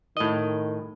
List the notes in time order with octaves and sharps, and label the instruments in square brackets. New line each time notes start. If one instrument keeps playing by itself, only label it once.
[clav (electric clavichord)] A2 D#5 [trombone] D#3